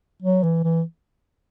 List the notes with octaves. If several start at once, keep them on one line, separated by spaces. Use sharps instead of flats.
F#3
E3
E3